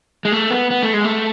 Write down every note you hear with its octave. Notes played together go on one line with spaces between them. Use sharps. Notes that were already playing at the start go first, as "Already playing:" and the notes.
G#3
A3
B3
B3
A3
G#3
A3